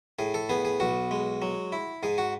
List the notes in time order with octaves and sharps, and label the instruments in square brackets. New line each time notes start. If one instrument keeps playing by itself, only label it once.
[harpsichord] A2 G#4
A4
B3 G#4
G#4
B1 F#4
G#3
F#3
E4
G#2 G#4
F#4